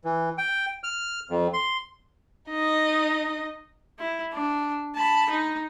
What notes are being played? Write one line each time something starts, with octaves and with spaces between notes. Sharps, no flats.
E3
G5
F6
F2
C6
D#4 D#5
E4
D4
A5 B5
D#4